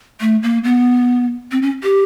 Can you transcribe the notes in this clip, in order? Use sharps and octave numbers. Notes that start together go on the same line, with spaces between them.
A3
A#3
B3
C4
C#4
G4